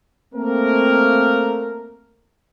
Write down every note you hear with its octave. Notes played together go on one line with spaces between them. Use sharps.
A3 A#3 C4 A#4